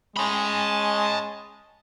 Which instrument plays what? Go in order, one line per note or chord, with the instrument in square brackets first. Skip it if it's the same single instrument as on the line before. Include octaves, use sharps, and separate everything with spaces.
[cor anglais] G#3 [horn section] C#4 D#5 [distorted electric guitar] A5 B5